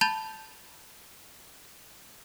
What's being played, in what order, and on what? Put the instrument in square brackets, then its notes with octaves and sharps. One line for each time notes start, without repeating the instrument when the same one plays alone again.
[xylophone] A5 B5 G6 A6 F7 G7